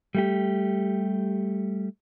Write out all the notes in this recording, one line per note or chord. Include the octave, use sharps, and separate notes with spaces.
G3 A3 G4